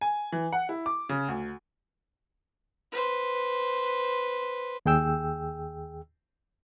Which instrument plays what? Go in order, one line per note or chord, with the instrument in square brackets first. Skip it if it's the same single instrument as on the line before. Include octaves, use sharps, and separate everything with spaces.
[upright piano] G#5
E3
F#5
E4
D6
C#3
D2
[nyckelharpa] B4 C5
[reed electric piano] D#2 G#4 G5 E6